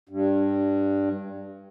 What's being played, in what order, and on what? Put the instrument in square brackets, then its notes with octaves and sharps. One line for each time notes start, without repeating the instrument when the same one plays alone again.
[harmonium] G2